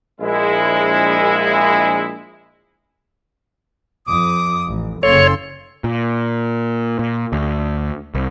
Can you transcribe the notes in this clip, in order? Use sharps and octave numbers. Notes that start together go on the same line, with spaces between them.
A#1 G#3 E4
F2 D6 D#6
A1
F#1 F#2 C#3 A#3 A4 C#5 C6
A#2
A#2
D2
C2